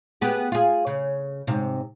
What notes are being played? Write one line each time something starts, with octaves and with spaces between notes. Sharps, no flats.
B3 G4 G#4
F4 G#4
C#3
G#2 C3